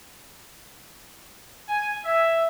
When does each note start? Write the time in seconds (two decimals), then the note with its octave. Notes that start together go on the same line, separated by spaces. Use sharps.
1.69 G#5
2.05 E5